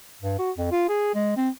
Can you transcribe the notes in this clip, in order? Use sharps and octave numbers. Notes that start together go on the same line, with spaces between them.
G2
F#4
F2
F4
G#4
G#3
C4